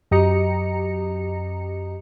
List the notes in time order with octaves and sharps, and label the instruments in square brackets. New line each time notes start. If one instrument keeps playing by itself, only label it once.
[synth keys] F#2 G4 D#5 A#5 C#7